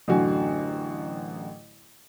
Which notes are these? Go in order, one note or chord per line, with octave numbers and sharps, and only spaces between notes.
A1 F#2 D3 F#4 G#5